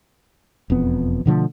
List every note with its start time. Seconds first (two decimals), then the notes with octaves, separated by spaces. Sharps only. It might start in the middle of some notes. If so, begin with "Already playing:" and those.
0.70 E1 F2 B3
1.26 B2 D3 F3 A3